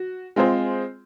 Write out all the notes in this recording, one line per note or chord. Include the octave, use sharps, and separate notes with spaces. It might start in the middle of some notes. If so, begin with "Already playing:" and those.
Already playing: F#4
G#3 C4 F4 G#4 C5